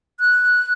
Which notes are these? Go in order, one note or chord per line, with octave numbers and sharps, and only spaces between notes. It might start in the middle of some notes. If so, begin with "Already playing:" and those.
F#6